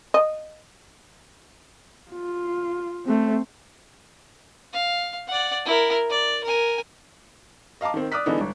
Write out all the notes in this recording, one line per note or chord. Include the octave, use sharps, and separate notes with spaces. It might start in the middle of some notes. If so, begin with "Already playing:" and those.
D#5
F4
A3 C4
F5
D5 F#5
E4 A#4
D5
A#4 G#5
D#5 F5 A5 A#5 D6
D#3 C4
D5 D6 D#6 F6 F#6 B6
D3 E3 G#3 B3 D4 D#4
G1